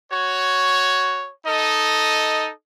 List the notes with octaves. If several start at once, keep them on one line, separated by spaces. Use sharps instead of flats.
F#4 C#5
D#4 A4 D#5